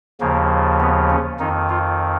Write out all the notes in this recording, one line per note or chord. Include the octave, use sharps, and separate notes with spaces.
D#2 C#3 F3 A#3
B3
C#4
F2 D#3 D#4
F4